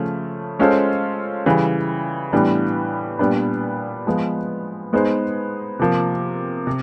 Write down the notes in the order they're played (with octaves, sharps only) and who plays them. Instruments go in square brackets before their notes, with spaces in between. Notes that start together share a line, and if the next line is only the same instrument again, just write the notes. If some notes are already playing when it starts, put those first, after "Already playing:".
Already playing: [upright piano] C#3 F3 A3 C#4
G#3 C#4 F4 A4 C5
C#3 E3 G3
A2 E3 G3 B3 D4
A#2 G3 B3 D4
F3 G#3 B3
G#3 B3 D#4 G#4 C5
C3 F3 A#3
C3